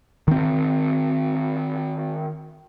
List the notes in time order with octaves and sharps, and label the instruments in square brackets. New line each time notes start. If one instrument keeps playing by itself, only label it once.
[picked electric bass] D#3 C4